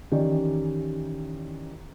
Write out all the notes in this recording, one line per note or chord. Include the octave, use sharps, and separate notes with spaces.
D#3 E3 C#4 G4 D5 D#5